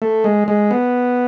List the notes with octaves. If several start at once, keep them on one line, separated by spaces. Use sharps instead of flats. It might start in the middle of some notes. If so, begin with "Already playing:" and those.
A3
G#3
G#3
B3